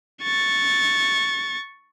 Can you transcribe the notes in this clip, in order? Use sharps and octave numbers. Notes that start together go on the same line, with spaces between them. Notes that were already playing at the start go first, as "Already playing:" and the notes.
C#6 A6